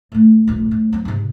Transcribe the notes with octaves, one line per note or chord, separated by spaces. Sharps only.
A2 A3
D1 A#1
A2
F#3 C4
G#2 C3